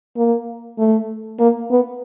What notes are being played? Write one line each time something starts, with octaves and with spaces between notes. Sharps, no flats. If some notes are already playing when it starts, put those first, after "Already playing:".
A#3
A3
A#3
B3